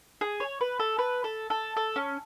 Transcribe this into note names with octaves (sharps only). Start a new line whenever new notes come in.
G#4
C#5
B4
A4
B4
A4
A4
A4
C#4